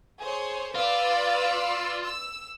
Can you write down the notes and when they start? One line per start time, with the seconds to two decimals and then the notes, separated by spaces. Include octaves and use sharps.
0.20 G#4 C5 C#5
0.75 F4 B4 D5 E6
2.03 E6